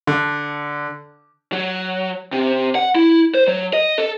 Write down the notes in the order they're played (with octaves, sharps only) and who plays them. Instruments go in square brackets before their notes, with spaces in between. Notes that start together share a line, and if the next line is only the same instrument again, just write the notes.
[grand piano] D3
[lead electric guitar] F#3
C3
F#5
E4
C5
F#3
D#5
A4